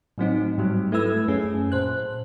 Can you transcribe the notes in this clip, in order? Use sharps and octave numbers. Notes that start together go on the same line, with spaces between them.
A2 F#3 C4 D#4
G#2 F#3 G3
A3 E4 A4 B4 E6 G#6
F#2 C#4 G#4
A#2 C5 F#6